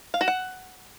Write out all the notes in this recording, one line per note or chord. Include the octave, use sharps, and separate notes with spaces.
F5
F#4
F#5